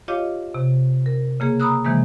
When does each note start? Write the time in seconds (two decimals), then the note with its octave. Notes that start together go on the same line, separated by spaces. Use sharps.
0.08 F4 G4 C#5 D#5 F5 D6
0.54 C3
1.06 A#4
1.40 C#3 A#3 G#4
1.60 A#5 B5 D#6 E6 F#6
1.85 C3 D#3 E3 G#3 A#3